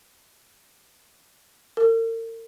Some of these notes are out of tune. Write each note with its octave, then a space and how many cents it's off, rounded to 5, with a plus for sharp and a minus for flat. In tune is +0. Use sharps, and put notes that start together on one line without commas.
A#4 -40